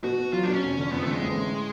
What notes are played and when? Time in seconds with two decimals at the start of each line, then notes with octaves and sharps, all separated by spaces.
0.04 B2 F#4
0.19 B3
0.33 F#3 F4
0.43 B2 D4
0.53 C#4
0.63 F1
0.78 D3
0.92 F2 B3
1.02 D3 A3
1.12 G#3
1.21 A1
1.36 A2